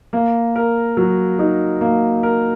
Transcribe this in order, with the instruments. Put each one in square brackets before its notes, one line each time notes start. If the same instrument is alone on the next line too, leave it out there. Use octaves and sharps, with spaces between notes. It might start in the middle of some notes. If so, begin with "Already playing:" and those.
[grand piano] A#3
A#4
F#3
D#4
A#3
A#4